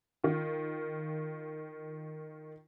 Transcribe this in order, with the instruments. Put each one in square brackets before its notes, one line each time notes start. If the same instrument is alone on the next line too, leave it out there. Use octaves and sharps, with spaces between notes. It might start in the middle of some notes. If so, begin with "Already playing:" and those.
[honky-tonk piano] D#3 F4